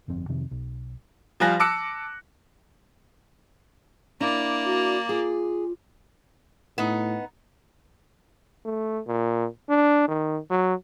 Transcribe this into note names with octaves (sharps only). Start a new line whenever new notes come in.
G1 F2 C4
F2 C3 D#3
B1
F3 G3 F4 G#5 F#6 A#6
A5 D6 E6 F#6 C#7
A#3 D4 E4 D5
F#4
F4 G#4
A2 B3 D#4
A3
A#2
D4
D#3
F#3